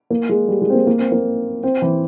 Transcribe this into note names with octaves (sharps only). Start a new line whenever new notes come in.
A#3
G#3
G3
G#3
C4
A#3
A#3
C4
A#3
C4
E3